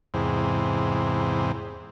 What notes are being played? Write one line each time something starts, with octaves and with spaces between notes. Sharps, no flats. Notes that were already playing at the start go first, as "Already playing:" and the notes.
E2 G#2 C3